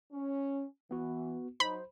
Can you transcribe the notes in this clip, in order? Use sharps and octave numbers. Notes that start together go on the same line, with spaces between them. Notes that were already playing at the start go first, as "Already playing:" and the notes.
C#4
E3 B3 F#4
F#3 D#4 C5 B5